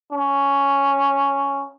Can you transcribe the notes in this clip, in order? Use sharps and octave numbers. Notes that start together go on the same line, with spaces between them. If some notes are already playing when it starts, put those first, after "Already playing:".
C#4